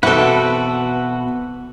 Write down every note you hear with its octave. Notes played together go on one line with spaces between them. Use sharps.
B2 E3 C4 F#4 A4 B4 F#5 G5